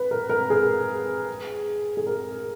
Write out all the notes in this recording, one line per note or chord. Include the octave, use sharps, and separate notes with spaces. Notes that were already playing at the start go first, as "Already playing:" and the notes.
Already playing: B4
A#4
A#4
G#4
G#4
A#4